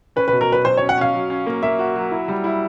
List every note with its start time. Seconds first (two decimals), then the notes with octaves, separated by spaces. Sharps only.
0.16 C#4 B4
0.28 B4
0.32 B2
0.41 A#4
0.49 F#3 B4
0.65 F#3 C5
0.77 C#5
0.82 C#4
0.89 F#5
0.98 C#4 F5
1.14 F#3
1.30 C#4
1.46 A#3
1.63 A#3 E5
1.79 F#4
1.96 F#3
2.11 E4
2.28 G3
2.44 E4